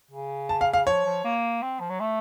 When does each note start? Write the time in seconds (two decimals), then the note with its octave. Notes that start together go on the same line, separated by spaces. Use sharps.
0.11 C#3
0.49 A5
0.61 F5
0.73 F5
0.87 F3 C#5
1.06 F3
1.24 A#3
1.63 C4
1.80 F3
1.90 F#3
2.00 A3